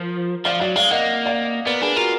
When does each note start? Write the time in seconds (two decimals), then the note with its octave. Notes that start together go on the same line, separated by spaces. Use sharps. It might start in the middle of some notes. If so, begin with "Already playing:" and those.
Already playing: F3 A#4
0.45 F3 D5 F5
0.60 F#3 D5 F5
0.76 G#3 D5 F5
0.91 A#3 D#5 F#5
1.26 D5 F5
1.66 B3 A#4 D5
1.81 D4 G#4 B4
1.96 F4 F#4 A#4